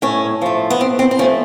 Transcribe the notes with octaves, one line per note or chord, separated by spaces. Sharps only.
A2 C#4
F3 A3
B3
A2 C4
C4
C4
F3 A3 C#4